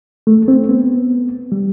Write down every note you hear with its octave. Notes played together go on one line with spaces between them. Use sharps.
A3
C4
B3
G3